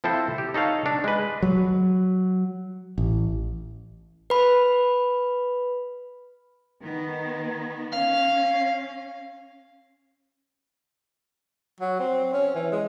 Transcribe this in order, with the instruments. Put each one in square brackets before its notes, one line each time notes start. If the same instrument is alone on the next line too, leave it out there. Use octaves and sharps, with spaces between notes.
[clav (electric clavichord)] F3 C4 E4 A4 C5
G4
D#4 A4 C#5 F5
D4
G#3 B4
[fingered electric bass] F#3
A1
[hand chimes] B4 B5
[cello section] D#3 B3
[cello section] C#4 [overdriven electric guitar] F5
[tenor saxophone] F#3
C4
C#4
E3
G#3